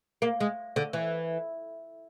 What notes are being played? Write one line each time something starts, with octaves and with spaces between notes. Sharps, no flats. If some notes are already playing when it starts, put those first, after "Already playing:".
A#3
G#3
D3
E3